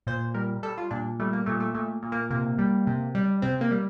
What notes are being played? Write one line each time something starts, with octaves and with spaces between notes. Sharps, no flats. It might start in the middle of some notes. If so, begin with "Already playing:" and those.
A#2 C5
G3 A#4
G3 A4
F4
A#2 D4
G3 A3
A#3
A#2 A3
A3
A#2 A3
A#2
A#3
C3 A#3
G3
C3
G3
C3 C4
A#3
G3